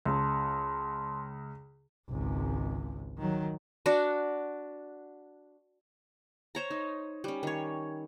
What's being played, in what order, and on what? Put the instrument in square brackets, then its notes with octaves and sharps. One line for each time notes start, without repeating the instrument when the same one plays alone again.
[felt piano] C#2 [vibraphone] A5 C6
[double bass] G#1 C#2
D#3 F#3
[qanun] D4 F#4 D5
C5 C#5 A#5
D#4
G3 C#4
D#3 C#5